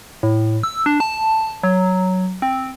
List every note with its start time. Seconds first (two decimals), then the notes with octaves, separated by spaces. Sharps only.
0.23 A2
0.63 E6
0.86 D4
1.00 A5
1.63 F#3
2.42 C4